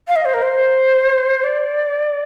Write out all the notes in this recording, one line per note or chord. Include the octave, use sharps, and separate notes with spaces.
F5
D#5
C5
A#4
C5
D5